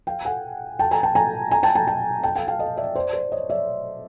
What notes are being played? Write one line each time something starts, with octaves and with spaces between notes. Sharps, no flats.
F5 G5
F#5 G#5
G5 A5
G#5 A#5
G5 A5
G#5 A#5
G#5 A#5
G5 A5
G5 A5
G5 A5
G5 A5
F5 G5
F5 G5
D#5 F5
D5 E5
C5 D5
C5 D5
C#5 D#5
D5 E5